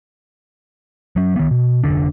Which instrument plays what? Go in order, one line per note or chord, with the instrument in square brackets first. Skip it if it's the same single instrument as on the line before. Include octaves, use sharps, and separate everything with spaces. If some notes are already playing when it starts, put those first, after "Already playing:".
[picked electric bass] F#3 C#4
D#3 B3
B2
F1 D3 D4